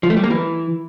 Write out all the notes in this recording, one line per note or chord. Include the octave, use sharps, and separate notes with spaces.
F3
A3
G3
A#3
E3